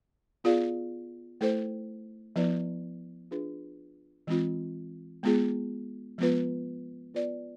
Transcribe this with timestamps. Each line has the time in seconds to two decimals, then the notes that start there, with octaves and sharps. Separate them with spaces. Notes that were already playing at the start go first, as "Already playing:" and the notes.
0.44 B3 F4 G#4 D5 F5
1.41 A3 E4 A4 C5
2.36 F3 B3 E4 B4 D5
3.31 D4 F4 G#4 B4
4.27 E3 G#3 C4 F4
5.23 G#3 B3 F4 G#4
6.18 F3 G#3 B3 F4 B4
7.14 B3 F4 B4 D5